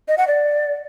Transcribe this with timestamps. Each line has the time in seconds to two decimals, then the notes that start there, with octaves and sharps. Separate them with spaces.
0.08 D#5
0.18 F#5
0.27 D5